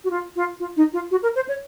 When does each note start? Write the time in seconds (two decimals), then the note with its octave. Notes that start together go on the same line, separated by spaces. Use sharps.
0.04 F#4
0.10 F4
0.36 F4
0.60 F4
0.77 D#4
0.93 F4
1.11 F#4
1.23 A#4
1.36 C5
1.49 C#5